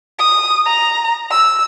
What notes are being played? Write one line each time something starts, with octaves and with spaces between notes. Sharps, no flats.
D#6
A#5
E6